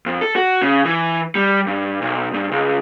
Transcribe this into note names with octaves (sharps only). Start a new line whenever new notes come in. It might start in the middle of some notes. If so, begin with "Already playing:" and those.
F2
A4
F#4
C#3
E3
G3
G2
B1
G2
C#2